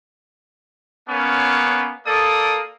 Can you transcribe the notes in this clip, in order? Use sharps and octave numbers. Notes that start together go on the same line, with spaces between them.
A#3 B3 C#4
A#3 A4 D5 D#6